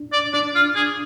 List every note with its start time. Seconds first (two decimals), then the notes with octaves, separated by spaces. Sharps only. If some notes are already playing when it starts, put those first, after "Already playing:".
Already playing: D4
0.13 D5
0.34 D4 D5
0.55 F4
0.76 G#4